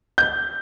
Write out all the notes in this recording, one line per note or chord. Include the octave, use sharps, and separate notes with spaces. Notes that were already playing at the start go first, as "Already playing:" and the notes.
G6